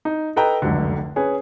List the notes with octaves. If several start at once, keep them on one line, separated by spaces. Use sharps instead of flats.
D#4
A4 B4 D#5 G5 A#5
F1 C#2 F#2 D3
C#4 G#4 B4